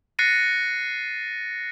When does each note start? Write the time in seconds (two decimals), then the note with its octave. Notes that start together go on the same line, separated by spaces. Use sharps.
0.19 F#6 A6 A#6 C7 C#7 D#7